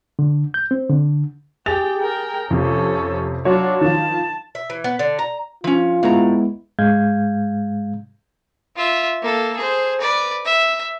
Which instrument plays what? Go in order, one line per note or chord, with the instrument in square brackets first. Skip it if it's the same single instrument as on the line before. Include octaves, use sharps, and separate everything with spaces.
[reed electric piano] D3
G6
C4
D3
[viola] G4 G5 [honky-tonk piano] G#4 A6 F7
[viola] A#4 G5
[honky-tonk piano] F2 C3 [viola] C#4 A4
[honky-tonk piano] F#3 F#4 C#5 [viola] D4 F4
[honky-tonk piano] D#3 F3 [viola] A5
[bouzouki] E5
E3
B3
D3
A#5
[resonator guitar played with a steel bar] F3 C#4 [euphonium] F4
[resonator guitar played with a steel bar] A2 A#5 [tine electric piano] G#3 B3 E4
[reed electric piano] G#2 G#3 F5 G6 G#6
[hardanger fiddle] F4 E5
A#3 A4
G#4 C5
B4 D5
E5